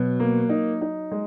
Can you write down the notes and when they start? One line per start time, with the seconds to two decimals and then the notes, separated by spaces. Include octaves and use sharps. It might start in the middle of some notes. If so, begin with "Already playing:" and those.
Already playing: B2 F#3
0.20 A#3
0.49 D#4
0.81 D#4
1.12 G#3